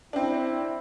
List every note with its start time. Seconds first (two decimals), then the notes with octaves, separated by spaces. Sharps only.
0.13 C4 D4 E4